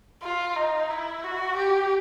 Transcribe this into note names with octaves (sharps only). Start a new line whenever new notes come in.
F4
D#4
E4
F#4
G4